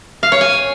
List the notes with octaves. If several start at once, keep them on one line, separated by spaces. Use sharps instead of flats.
F5
C#5
G#5